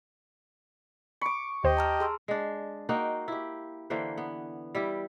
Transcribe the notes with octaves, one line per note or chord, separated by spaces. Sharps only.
B5 C#6 D6
D#2 G4 C5 D#5
A5 A#5 F6
G#4 C6 E6
G#3 D4
A#3 D#4 F#4 G5
E4 G4
D3 E3 A#3 C5
B3
G3 E4 G4